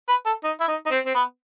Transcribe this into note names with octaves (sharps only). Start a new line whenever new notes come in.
B4
A4
D#4
E4
D#4
D#4
C4
C4
B3